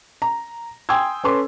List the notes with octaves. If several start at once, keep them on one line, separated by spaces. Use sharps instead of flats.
A#5
G5 G#5 C6 D#6 E6 G#6
C#4 A4 B4 C6 D6